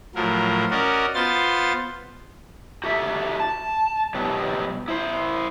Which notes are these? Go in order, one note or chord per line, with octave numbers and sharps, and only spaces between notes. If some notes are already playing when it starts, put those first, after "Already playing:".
A2 F3 F#3 A#4
C#4 F#4 A#4 D5 D#5
B3 F4 C5 C6 A6
F#4 G4 A4 E5
A5
B2 F#3 G3
E4 C5